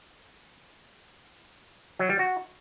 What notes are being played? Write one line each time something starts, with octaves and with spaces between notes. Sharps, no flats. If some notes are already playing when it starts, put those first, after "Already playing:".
F#3
G3
F#4